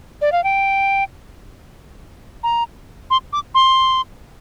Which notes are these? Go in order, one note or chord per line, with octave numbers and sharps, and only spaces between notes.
D5
F5
G5
A#5
C6
D6
C6